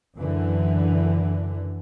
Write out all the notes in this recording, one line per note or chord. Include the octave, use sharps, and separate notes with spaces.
F#2 D3 E3